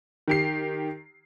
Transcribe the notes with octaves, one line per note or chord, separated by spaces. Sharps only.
D#3 G4 C7